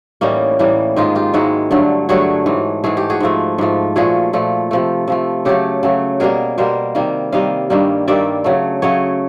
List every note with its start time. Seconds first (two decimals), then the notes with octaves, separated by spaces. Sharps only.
0.21 A2 E3 G3 A#3 C#4 D#4
0.59 A2 E3 G3 A#3
0.96 G#2 D#3 G#3 D#4 F4
1.15 F4 G4
1.34 G#2 D#3 G#3 E4 F#4
1.71 G2 D3 F#3 A3
2.09 G2 D3 F#3 A3 F#4 G#4
2.46 G#2 E3 A3
2.84 G#2 E3 A3 G#4
2.97 G4
3.10 F#4 G#4
3.20 G#2 F3 A3
3.58 G#2 F3 A3
3.96 A#2 F3 A3 F#4 G#4
4.33 A#2 F3 A3
4.71 C3 F3 A3
5.08 C3 F3 A3
5.45 C#3 F#3 A3 G4 A4
5.83 C#3 F#3 A3
6.20 B2 G3 A#3 G#4 A#4
6.58 B2 G3 A#3 A#4 C5
6.95 C3 D#3 G3 A#3
7.32 C3 D#3 G3 A#3 D#5 F5
7.70 G2 D#3 G3 A#3
8.08 G2 D#3 G3 A#3 D5 E5
8.44 C#3 F#3 A3
8.82 C#3 F#3 A3 C#5 D#5